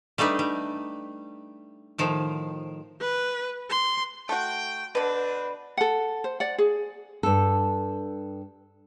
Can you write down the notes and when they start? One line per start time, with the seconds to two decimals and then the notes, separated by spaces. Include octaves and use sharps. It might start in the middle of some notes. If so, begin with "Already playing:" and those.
0.18 G3 A3 D4 D#4 B4
0.39 G3
1.98 A2 D#3 F3
3.01 B4
3.70 C6
4.29 A3 F#4 G5
4.95 B2 D3 C4 D4 B4
5.77 A4 F#5
6.24 C5
6.40 D5 F#5
6.58 G#4
7.23 G2 A4